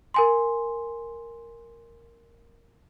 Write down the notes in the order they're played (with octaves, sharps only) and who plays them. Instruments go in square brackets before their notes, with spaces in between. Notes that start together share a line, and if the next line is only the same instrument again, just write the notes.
[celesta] A#4 G#5 C6